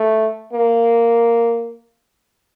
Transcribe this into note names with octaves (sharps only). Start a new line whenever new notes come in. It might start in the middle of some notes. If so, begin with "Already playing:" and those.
Already playing: A3
A#3